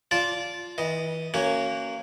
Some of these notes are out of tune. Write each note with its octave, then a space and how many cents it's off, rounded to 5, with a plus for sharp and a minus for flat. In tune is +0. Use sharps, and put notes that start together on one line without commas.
F4 +0 D5 -15 A5 -15
E3 -30 D#5 +0
A#3 -20 C#4 +0 F#4 +10